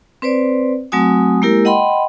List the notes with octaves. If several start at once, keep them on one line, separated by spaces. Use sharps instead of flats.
C4 B4 C5 D5
F#3 A3 C4 F#4 G#5 D#6
G#3 A#3 E4 G4 A#4
D#5 F#5 G5 B5 C6